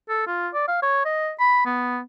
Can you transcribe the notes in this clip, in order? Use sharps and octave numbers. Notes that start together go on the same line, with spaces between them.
A4
F4
D5
F5
C#5
D#5
B5
B3